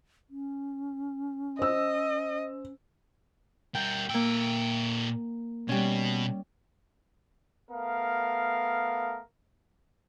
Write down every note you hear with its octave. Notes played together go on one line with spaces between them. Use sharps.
C#4
C5 D#5 E6
G3 A#4 G5
A#2 A#3 G5 E6
B2 G3 C#4
A3 B3 A#4 F5